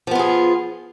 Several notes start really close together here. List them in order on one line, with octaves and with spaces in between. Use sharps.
F3 B3 F4 G#4